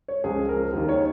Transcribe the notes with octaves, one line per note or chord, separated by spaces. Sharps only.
C#5
C#2 C#3 F3 G#4
A#4
D#2 D#3
C#5